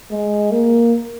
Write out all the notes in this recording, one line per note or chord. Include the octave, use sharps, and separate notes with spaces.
G#3
A#3